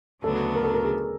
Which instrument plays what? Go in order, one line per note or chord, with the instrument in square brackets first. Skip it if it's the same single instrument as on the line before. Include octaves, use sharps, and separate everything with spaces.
[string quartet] D2 C#3 F#3 B3 D4 [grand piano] A4
[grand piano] A#4
A4
A#4
G#4